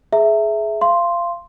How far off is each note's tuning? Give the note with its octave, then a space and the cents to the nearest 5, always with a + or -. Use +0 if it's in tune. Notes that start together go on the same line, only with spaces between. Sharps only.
G#4 +25 E5 +0 A#5 -30
F5 -25 C6 +0